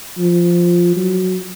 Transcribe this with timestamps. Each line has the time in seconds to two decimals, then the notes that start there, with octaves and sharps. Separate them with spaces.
0.18 F3
0.97 F#3